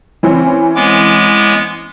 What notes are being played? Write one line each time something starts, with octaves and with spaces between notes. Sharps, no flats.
E3 C4 C#4
G#3 B3 D6